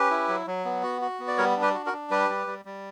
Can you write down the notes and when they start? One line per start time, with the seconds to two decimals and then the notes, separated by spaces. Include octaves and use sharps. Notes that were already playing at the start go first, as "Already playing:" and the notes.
Already playing: C#4 G4 B4
0.10 E4
0.28 F#3
0.47 F#3
0.65 B3
0.83 F#4
1.01 F#4
1.20 B3
1.27 D5
1.38 G3 A#4 C#5
1.56 D4
1.62 G4 B4
1.74 F#4
1.86 F#4 A#4
1.93 D4
2.10 G3 G4 B4
2.29 G3
2.47 G3
2.65 G3